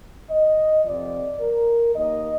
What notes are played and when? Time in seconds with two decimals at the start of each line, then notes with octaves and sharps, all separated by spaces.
0.30 D#5
0.85 F2 C3 F3 D5
1.40 A#4
1.95 D#2 D#3 A#3 D#5